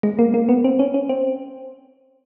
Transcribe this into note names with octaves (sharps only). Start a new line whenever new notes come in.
G#3
A#3
A#3
B3
C4
C#4
C#4
C4